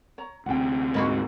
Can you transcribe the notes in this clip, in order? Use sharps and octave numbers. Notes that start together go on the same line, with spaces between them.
C#5 A#5
D2 C3 F#5 G5
G#2 A#3 F#4 A#4 D#5 B5